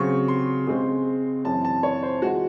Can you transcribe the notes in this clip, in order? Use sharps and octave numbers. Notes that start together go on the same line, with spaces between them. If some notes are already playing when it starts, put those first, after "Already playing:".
Already playing: C#3 F#3 C4 C#6
C6
C#3 G#3 C4
F#2 E3 C4 A5
A5
C#5
C5
E3 G#3 F#4